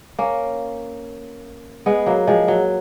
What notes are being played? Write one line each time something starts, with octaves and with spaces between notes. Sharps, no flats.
A#3 C#4
G#3 B3
F#3 A#3
F3 G#3
F#3